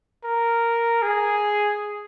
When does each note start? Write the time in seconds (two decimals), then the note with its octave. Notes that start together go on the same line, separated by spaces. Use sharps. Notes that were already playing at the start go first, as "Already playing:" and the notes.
0.24 A#4
1.03 G#4